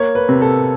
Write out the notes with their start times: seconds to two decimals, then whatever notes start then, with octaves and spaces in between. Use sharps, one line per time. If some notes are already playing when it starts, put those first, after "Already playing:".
Already playing: A#3 C#5
0.15 B4
0.29 C3
0.42 A4